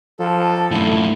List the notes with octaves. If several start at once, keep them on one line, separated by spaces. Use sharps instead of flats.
F3 A4
F#2 A2 E4